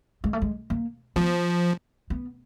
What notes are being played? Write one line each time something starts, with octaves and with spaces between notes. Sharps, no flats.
G#3
A3
G#3
A#3
F3 B3
B3